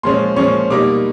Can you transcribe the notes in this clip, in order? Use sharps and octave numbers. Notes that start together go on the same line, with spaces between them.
A#2 F3 G#3 C#4 C6
A#2 F3 G#3 C#4 C#6
B2 G3 A#3 D#4 D6